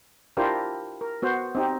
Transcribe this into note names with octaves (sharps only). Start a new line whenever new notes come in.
D4 E4 F4 G4 A#4 C5
A#4
B3 F#4 C5
C4 D#4 G4